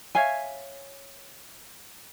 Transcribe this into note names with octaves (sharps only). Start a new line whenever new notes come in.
C#5 E5 F5 G#5